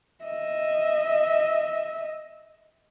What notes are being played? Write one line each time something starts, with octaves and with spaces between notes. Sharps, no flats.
D#5 E5